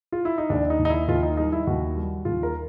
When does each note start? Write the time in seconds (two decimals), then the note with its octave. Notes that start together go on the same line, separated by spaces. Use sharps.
0.12 F4
0.25 E4
0.38 D#4
0.50 D#2 D4
0.70 D#4
0.79 D#2
0.85 D#4
0.90 E4
1.08 D#2 F4
1.23 D#4
1.37 G3 D#4
1.52 E4
1.67 D#2 F#4
1.97 G3
2.25 D#2 F4
2.43 A#4